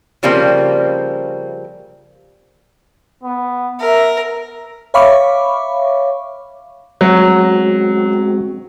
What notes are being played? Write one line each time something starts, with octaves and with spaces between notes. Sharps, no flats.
C#3 F3 G3 A#3 C4
B3
A#4 E5
C#5 E5 F5 B5 C#6 D6
F#3 G#3 C4 F#4